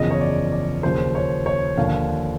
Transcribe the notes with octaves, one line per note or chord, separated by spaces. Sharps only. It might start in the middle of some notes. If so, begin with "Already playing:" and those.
Already playing: F#1 E2 C#3 F3 D#5
C#5
D5
D5
D#2 C#3 F3 C5
C#5
C#5
D#2 D3 F3 F5